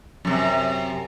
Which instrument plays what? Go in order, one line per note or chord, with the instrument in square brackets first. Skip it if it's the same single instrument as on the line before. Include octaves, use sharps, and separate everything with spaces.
[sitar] F#2 C3